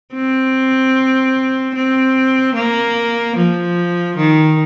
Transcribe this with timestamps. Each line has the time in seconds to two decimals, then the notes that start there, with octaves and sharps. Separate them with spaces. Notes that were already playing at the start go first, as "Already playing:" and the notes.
0.13 C4
1.75 C4
2.55 A#3
3.36 F3
4.17 D#3